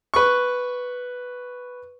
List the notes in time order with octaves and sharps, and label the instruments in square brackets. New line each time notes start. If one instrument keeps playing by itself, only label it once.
[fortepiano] B4 C#6